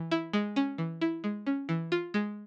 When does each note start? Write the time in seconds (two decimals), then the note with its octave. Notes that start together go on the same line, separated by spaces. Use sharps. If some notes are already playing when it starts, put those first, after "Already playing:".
Already playing: E3
0.11 E4
0.33 G#3
0.56 C#4
0.78 E3
1.01 E4
1.24 G#3
1.46 C#4
1.69 E3
1.92 F4
2.14 G#3